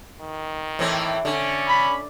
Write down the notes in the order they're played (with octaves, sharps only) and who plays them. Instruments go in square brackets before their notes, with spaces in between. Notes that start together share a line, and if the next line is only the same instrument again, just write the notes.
[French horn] D#3
[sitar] A2 E3 C4
[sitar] D3 [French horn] C#4
[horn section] B5